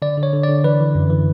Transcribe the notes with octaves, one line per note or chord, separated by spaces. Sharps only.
D3 D5
D3
C#5
D3
D5
D3
E3 B4
E3
F#2
E3